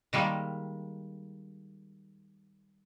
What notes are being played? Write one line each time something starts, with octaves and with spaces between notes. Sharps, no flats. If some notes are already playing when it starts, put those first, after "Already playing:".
D#3 G3 G#3 A#3